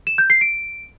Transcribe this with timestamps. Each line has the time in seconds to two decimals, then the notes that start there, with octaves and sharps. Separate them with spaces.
0.07 E7
0.18 G6
0.30 C7
0.41 D7